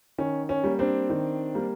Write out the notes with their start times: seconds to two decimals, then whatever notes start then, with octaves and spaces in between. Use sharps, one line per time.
0.18 D#3 C#4
0.49 C#4
0.64 G3 A#3
0.79 C4 D4
1.10 D#3
1.54 G3 A#3